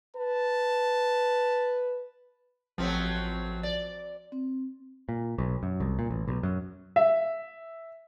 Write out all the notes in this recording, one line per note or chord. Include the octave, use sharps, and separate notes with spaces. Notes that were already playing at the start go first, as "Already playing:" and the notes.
B4 A5
A1 F3 F#3 A3 C4
D5
C4
A#2
B1
F#2
C2
A#2
A1
B1
F#2
E5